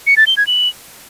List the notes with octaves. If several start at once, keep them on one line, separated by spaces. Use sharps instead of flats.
C#7
A6
G7
G#6
F#7